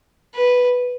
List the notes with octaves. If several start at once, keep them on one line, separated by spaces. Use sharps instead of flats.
B4